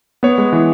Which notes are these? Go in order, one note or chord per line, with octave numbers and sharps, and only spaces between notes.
B3 C#5
G#3
E3